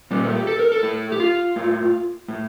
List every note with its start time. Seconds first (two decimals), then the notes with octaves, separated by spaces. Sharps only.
0.11 A#2 G3
0.24 A3
0.35 G4
0.47 A4
0.59 A#4
0.72 A4
0.83 A2
1.12 G4
1.20 F4
1.56 A2
2.28 A2